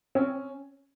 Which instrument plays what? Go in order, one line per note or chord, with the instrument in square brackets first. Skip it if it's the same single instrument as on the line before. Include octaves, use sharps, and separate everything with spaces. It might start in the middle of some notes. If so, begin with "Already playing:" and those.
[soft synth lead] C4 [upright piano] C#4